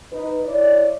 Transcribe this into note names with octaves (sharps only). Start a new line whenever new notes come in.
D#4 B4
E4 C#5 D5